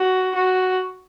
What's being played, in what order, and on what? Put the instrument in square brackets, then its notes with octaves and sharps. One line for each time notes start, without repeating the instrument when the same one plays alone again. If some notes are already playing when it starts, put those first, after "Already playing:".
Already playing: [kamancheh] F#4
F#4